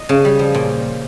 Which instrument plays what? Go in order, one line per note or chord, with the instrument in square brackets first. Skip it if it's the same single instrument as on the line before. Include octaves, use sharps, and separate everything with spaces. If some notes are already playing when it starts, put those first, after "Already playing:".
Already playing: [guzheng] D#5
C#3
G3
F3
A#2